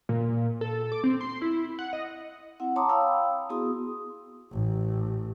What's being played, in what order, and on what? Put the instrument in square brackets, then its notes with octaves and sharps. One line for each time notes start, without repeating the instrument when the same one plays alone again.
[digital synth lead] A#2
A4
D6
C4
C6
E4
F#5
D#5
[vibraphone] C4 E4 F#5
C#5 A5 A#5 C6 D6 D#6
F5 G5 B5 D#6 E6
B3 E4 F#4 G#4 C6 D#6
[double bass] A1